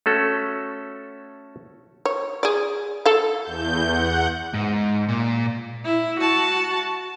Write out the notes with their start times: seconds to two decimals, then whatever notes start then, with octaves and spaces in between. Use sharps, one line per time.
0.06 A3 C#4 F#4 A4
2.05 C#5
2.43 G#4 D5
3.06 A4 F5
3.43 E2 G6
3.88 F#5
4.54 G#2
5.08 A#2
5.85 E4
6.19 F#4 A5